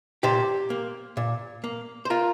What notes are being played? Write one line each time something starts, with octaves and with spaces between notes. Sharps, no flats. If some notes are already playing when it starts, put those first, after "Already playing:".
A#2 G4 C5
A#3
A#2
A#3
C5
F4 A#4